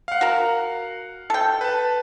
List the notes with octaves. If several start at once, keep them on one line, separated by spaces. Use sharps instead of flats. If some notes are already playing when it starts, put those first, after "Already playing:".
F5 F#5
F#4 A#4
A4 G5
B4 A5